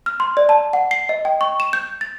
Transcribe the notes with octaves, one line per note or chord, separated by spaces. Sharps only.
F6
C6
D5
A5
F#5
C7
D#5
G5
C#6
E7
G6
A6